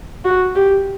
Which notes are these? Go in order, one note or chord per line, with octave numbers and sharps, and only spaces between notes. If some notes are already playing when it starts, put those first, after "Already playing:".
F#4
G4